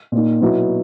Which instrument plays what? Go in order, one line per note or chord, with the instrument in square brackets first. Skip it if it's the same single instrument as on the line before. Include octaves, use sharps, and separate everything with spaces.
[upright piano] A#2 A#3 D#4
B2 F#3 B3 E4